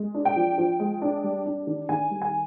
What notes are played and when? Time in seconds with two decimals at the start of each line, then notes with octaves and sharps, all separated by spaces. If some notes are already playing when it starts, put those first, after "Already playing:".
Already playing: G#3
0.14 D4
0.25 G5
0.36 F3
0.58 F3
0.80 G#3
1.02 D4
1.24 G3
1.46 D4
1.67 D#3
1.89 D#3 G#5
2.11 G3
2.22 G#5